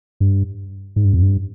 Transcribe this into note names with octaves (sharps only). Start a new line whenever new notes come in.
G2
G#2
G2
F2
G2